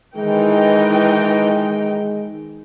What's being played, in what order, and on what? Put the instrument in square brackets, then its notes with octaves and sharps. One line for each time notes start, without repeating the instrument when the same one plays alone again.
[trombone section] D#3 G#3 [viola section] E3 D#4 G5